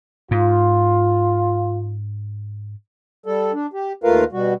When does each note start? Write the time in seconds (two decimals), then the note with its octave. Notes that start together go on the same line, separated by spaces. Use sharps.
0.31 G#2 F4
3.26 G3 A4
3.53 D4
3.73 G4
4.04 D#2 A3 F4 A#4 B4 F5
4.32 B2 G3 F#4